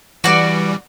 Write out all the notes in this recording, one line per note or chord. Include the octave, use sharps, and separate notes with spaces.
E3 G3 F#4 D5